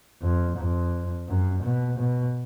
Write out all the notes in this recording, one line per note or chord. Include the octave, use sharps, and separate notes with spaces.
F2
F2
F#2
B2
B2